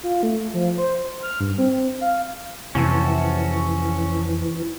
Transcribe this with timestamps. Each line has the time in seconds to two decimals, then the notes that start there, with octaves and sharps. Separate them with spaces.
0.03 F4
0.23 A3
0.54 F3
0.78 C5
1.22 F6
1.40 G2
1.58 C4
2.01 F5
2.75 F2 C3 E3 A#3 C#4 F#4 A4